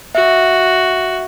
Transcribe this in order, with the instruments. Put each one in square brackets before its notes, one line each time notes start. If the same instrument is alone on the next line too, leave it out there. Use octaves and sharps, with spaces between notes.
[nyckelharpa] F#4 [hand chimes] E5